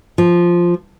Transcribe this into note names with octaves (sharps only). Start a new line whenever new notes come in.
F3